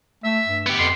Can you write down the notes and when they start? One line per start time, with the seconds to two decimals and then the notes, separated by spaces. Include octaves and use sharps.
0.24 A3 E5
0.47 G2
0.66 B3 G4
0.79 F2 C6